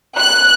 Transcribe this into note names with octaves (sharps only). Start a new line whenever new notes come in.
F#6